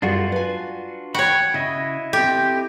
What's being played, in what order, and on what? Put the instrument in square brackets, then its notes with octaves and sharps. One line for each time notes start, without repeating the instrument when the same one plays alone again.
[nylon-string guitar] F#2 G3 G#4 [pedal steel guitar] D4 F4 F#4
[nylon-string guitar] B4 G#5
[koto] F#4 C#5 [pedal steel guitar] G5 B5
[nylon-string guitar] C#3 [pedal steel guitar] E4 D#5
[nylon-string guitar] C4 A4 [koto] G4